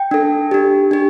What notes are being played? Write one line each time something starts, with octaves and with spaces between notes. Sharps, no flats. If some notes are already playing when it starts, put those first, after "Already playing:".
Already playing: G5
D4 A4
D4 G4
D4 G4